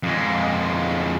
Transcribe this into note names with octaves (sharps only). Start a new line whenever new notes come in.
F2 G#3